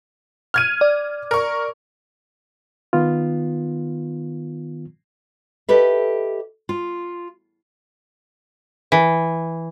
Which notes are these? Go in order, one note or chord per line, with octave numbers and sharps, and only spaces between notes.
F6 G#6 D#7
D5
A#4 C#6
D#3 B3 F4
G4 A4 B4 D#5 E5
F4
E3